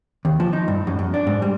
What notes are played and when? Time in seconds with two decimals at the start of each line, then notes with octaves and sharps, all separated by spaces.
0.25 D#2
0.40 F3
0.53 D#4
0.68 G2
0.87 F#2
0.99 F#2
1.14 D4
1.27 G#2
1.42 G3